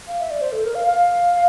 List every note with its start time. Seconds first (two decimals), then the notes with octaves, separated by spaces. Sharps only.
0.08 F5
0.20 E5
0.31 D5
0.41 C5
0.52 A4
0.64 A#4
0.75 F5
0.87 F5